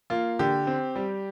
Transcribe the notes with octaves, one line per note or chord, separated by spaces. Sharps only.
A#3 F4
D3 G4
C4
G3